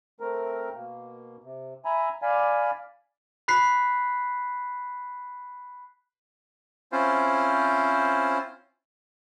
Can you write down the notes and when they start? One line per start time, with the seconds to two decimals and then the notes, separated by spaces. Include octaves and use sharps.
0.20 A3 C4 A#4
0.75 B2 A#3
1.44 C3
1.85 E5 G#5 A#5 B5
2.22 D5 F5 G#5 B5
3.48 B5 F#6 B6 C7
6.92 C4 C#4 E4 F4 C5